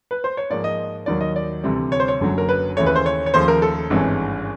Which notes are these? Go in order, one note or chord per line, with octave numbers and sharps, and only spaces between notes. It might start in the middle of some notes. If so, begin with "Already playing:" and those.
B4
C5
C#5
G#2 F3 A#3 D5
D#5
D#2 D#3 F#3 D5
D#5
D5
D2 C3 E3 G3
C#5
C5
C#5
F#1 F#2 D3 F#3
A#4
B4
D#2 C#3 E3 A3 C#5
B4
C5
C#5
C#5
D#2 C#3 F3 A3 C5
A#4
A4
G#1 G2 E3 G#3 C#4